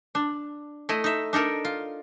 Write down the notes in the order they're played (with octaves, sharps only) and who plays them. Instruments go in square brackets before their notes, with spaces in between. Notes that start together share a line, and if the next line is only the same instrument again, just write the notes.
[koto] D4
A3 E4 D#5
D#4 E5
D4 D#4 A4 A#4
F4